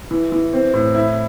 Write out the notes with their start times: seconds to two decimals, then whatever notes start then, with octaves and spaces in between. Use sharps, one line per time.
0.11 E3
0.32 E3
0.53 C4
0.73 A2
0.95 E4